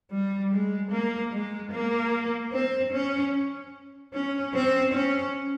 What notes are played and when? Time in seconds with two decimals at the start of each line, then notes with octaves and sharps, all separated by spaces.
0.11 G3
0.52 G#3
0.91 A#3
1.32 G#3
1.72 A#3
2.53 C4
2.93 C#4
4.13 C#4
4.54 C4
4.94 C#4